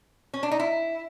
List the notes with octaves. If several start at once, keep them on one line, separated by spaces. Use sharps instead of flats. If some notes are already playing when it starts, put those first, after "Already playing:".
C#4
D4
D#4
E4